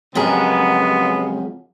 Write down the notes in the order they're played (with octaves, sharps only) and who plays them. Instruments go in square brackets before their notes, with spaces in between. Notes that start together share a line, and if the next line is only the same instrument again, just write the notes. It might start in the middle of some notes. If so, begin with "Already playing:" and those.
[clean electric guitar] F2 F#3 A#4 [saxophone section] C#3 G#3 [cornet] B3 [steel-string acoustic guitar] G4 G#4